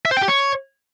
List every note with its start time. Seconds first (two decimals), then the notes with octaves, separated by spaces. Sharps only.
0.05 E5
0.11 C5
0.17 G5
0.22 G4
0.28 C#5